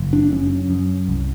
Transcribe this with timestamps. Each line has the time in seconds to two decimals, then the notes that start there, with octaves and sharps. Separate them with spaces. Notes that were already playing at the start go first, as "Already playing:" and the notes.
Already playing: F#1
0.13 D4
0.32 F#2 C#4
0.70 F#2
1.08 C2